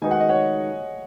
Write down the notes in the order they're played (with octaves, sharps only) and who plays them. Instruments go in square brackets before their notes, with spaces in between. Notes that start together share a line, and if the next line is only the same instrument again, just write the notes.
[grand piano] D#3 G#3 D#4 F#4 B4 [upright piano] G#5
[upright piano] F#5
D#5
C#5 F#5